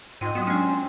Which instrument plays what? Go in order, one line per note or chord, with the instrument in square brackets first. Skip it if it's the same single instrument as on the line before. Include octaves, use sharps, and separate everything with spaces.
[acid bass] G#2 [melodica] C4 [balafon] F4 D#5
[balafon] F#3 F#4 [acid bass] B3
[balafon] G#3 D4 [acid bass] C#4